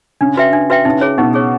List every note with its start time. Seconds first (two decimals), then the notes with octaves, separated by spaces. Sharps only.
0.21 C#3 D4
0.37 F#4 B4 E5 G5
0.53 D4
0.70 F#4 B4 E5 G5
0.85 C#3 D#4
1.01 G#4 C#5
1.18 B2 D#4
1.34 G#4 C#5